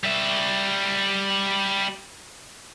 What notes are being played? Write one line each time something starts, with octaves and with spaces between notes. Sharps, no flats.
G3 E5